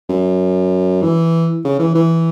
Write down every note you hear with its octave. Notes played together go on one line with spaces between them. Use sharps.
F#2
E3
C#3
E3
E3